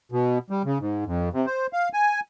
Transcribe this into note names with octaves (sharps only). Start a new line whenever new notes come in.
B2
G3
C#3
G#2
F2
C3
C5
F5
G#5